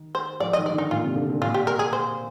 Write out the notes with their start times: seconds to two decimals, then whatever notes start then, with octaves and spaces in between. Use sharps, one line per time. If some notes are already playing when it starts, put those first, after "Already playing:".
Already playing: D#3
0.15 C5
0.40 F3 D5
0.53 D#5
0.58 D#3
0.66 D5
0.69 D#3
0.74 D3
0.78 D#4
0.91 A#2 F4
1.04 C3
1.16 D3
1.30 D3
1.42 A#2 F4
1.54 G4
1.67 A#4
1.79 G#4
1.93 C5